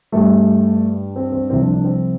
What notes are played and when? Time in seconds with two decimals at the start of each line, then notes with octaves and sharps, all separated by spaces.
0.12 G2 G3 A3
1.16 C4
1.32 C4
1.50 C2 C3 F3 C4
1.61 D4
1.72 D4
1.84 C4